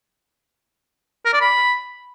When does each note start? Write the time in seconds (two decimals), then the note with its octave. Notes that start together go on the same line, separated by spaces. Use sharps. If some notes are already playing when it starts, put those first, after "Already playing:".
1.26 A#4
1.33 D5
1.41 B5